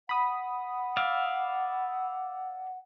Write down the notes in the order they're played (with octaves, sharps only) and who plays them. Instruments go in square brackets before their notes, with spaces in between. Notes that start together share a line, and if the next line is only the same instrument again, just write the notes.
[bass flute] F#5 [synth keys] B5 D#6
[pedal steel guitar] D5 E5 F5